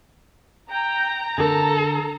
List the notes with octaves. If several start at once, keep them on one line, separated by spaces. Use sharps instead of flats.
G5 A#5
D3 A4 A#4